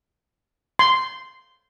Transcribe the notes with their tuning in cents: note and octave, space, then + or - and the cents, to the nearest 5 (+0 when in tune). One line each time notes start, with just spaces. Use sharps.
C6 -5